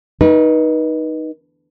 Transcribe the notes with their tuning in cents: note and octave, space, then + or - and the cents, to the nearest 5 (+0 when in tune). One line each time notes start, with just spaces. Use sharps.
D#4 +0 B4 -30